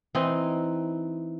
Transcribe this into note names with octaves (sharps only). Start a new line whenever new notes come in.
E3 C4 D#4 D#5